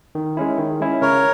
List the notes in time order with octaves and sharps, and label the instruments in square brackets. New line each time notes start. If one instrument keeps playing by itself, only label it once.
[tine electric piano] D#3
G#3 C#4 E4
D#3
G#3 C#4 E4
[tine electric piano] C#3 [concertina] A#4 C#5